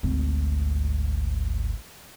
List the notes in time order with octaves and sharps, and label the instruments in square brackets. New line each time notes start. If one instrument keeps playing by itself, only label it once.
[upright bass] G#1 D2